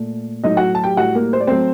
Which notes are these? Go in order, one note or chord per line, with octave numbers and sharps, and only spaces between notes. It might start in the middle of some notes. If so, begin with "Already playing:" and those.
Already playing: A#2 A3
A2 F#3 A3 D#4 D#5
F#4 F#5
A5
G4 G5
A2 G3 F#4 F#5
A#3 A#4
C5
D5
F#3 A3 C4 C5